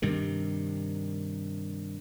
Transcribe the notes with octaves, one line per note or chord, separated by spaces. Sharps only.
G2 C3 D#3